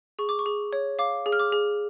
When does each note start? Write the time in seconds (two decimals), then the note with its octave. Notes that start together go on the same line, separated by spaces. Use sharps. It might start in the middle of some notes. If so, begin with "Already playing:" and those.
0.19 G#4 C#6
0.29 D6
0.39 C#6
0.46 G#4
0.73 C#5
0.99 F5 D6
1.26 G#4
1.32 F6
1.40 D6
1.52 G#4